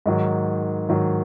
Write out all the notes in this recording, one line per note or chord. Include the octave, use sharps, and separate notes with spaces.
G#2 D#3 F#3
G#2 D#3 F#3